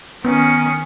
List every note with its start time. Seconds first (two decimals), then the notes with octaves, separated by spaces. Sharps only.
0.25 D#3 B3 C#4